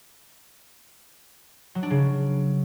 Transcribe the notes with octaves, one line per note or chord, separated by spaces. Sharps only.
F#3
D4
C#3